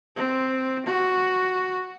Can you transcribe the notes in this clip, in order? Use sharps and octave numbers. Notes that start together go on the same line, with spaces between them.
C4
F#4